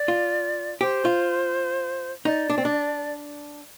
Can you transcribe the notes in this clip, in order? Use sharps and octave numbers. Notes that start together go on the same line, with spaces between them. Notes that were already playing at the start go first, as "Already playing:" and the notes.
Already playing: D5
F4
G4 C5
F4
D#4 D5
D4
C4
D4